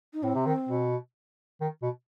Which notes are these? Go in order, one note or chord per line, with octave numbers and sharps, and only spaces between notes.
D#4
A2 C4
C3
D#3
B2
D#3
B2